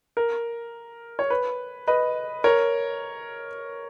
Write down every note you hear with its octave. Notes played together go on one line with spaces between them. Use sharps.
A#4
C#5
B4
B4 D#5
A#4 C#5